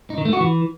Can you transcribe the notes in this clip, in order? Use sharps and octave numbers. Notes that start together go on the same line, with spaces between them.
D#4
D#3
A3
F#4
E3